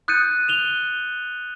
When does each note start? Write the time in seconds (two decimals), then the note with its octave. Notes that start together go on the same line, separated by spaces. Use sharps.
0.08 D#6 F#6 G6 A6 C#7 D#7
0.48 E7 F7 G7